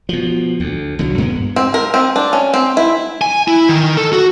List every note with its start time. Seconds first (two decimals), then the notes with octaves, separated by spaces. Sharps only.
0.09 B2 F3
0.60 D2
0.99 B1 D3 F#3
1.18 G2 G#3 A3 B3
1.56 C4
1.74 A#4
1.94 C4
2.16 D4
2.33 C#4
2.54 C4
2.77 E4
3.21 G#5
3.48 E4
3.69 D#3
3.97 A4
4.13 F#4